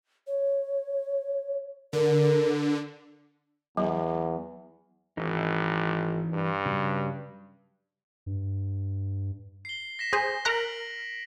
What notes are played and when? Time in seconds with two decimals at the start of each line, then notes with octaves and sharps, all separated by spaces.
0.27 C#5
1.93 D3 A#4
3.77 E2 F#3
5.17 G#1 E3 D#4
6.33 G2
6.66 C#3 F#3 G3
8.26 G2
9.65 C7 G7
9.99 A#6 B6 E7
10.13 G#4 C5
10.45 A#4 A#5 F#6 B6 D7 F#7